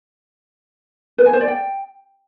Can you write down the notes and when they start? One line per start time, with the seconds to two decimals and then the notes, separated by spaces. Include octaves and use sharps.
1.18 B4
1.26 G#5
1.33 C5
1.41 D5
1.48 G5